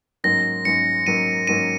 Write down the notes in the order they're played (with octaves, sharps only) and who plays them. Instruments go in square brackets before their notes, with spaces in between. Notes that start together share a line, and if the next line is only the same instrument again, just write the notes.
[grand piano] G#2 F#3 A#3 C#4 [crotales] A#6
[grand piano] G#2 F#3 A#3 C#4 [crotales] C#7
[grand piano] G#2 F#3 A#3 C#4 [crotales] D#7
[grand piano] G#2 F#3 A#3 C#4 [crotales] D#7